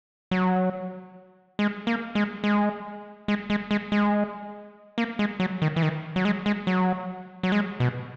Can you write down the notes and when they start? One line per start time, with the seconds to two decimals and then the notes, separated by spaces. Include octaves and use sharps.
0.31 F#3
1.59 G#3
1.87 A#3
2.15 G#3
2.44 G#3
3.28 G#3
3.50 G#3
3.71 G#3
3.92 G#3
4.98 A#3
5.19 G#3
5.40 F#3
5.62 D#3
5.76 E3
5.83 D#3
6.16 F#3
6.25 G#3
6.46 G#3
6.67 F#3
7.43 F#3
7.52 G#3
7.80 B2